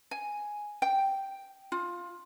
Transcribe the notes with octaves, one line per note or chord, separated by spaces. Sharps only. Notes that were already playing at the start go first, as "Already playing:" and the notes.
G#5
G5
F4